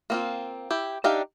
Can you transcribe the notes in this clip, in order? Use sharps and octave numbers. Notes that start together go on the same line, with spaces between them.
A#3 C4 F4
E4 G4
D4 D#4 G4 E5 F5